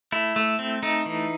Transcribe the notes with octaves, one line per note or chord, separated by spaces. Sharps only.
A3 E4
A3
C4
A3 D#4
E3